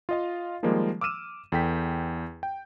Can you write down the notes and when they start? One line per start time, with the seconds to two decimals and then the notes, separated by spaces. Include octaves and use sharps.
0.09 F4 D#5 F5
0.63 D#3 F3 G3 G#3 A#3
1.01 D6 E6 F6 D#7 E7
1.52 E2 A4 G5 B6
2.43 G5